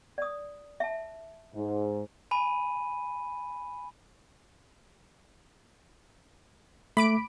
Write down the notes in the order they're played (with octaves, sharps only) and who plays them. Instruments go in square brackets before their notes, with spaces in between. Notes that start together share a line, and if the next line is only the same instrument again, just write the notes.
[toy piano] D5 D#6
E5 A5
[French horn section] G#2
[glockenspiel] G#5 B5 D#7
[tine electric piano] A3 [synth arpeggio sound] B5 D6 D7